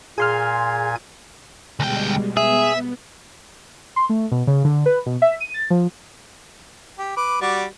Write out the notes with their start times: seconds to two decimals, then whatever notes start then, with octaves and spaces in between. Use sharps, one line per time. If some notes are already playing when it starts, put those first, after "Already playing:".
0.18 A#2 G#4 G#5 C6 F6 G#6
1.80 D2 B2 G3 G#3 G5
2.37 B3 G#4 E5
3.96 C6
4.09 A3
4.32 B2
4.47 C#3
4.64 D3
4.86 B4
5.06 B2
5.22 E5
5.40 D#7
5.54 A6
5.70 F3
6.99 G4
7.17 B4 D6
7.41 G3 F#4 D5